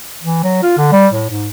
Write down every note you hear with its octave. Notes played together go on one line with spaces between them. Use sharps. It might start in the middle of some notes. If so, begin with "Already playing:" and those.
E3
F#3
F4
D3
G3
A2
G#2